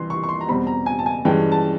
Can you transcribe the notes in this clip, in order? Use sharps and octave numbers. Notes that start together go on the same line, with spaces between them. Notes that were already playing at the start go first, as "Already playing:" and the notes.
Already playing: C2 C3 E3 C6
C#6
C#6
C6
A#5
E2 B2 G3 C4 B5
A#5
G#5
A5
G#5
G2 E3 G#3 C#4 G5
A5